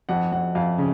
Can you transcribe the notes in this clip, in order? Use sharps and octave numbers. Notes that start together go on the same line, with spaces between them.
F2 F#5
F2 F#5
F2 F5
C#3